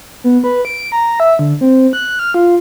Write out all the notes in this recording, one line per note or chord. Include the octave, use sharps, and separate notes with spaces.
B3
B4
D7
A#5
E5
D3
C4
F#6
F6
F4